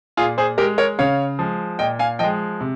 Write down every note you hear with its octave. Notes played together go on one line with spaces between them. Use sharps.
A#2 F4 G#4
G#4 C5
G#3 G4 A#4
A#4 C#5
C#3 C#5 F5
F3 G#3
A#2 D#5 G5
F5 G#5
F3 G#3 D#5 G5
C3